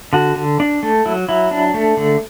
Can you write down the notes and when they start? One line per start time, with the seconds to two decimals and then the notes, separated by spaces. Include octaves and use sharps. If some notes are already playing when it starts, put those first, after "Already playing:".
0.13 D3 F#4
0.36 D3
0.60 D4
0.83 A3
1.06 F#3 E4
1.29 F#3 E4
1.51 D4
1.74 A3
1.97 D3